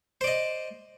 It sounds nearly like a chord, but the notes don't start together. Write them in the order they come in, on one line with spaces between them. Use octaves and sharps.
C5 D5 D#5